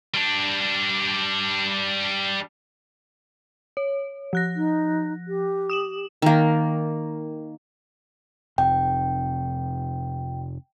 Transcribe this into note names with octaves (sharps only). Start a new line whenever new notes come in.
G3 D4
C#5
F3 F#6 A#6
D#4
G4
D#6 E7 F#7
D#3 A#3
F1 C3 G5